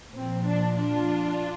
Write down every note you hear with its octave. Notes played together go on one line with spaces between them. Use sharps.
A#2 F3 C4
D4
D4 F4